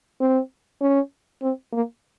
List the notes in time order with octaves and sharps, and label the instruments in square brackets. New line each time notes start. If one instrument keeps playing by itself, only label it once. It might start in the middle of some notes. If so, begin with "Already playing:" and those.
[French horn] C4
C#4
C4
A#3